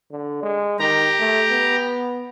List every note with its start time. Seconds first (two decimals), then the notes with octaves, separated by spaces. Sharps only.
0.11 D3
0.43 G#3
0.79 D#3 G4 A#5
1.19 A3
1.50 B3